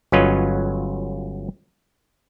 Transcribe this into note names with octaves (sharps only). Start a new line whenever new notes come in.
G1 F#3 C#4 F4 B4 D#5